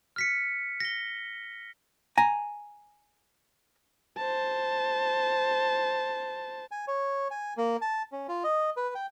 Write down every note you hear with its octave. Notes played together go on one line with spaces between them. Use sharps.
F6 B6 C#7
A#6 G7
G#5 A#5
C5 A5
G#5
C#5
G#5
A#3
A5
C#4
F4
D#5
B4
G5